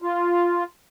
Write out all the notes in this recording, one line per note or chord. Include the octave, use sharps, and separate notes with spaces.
F4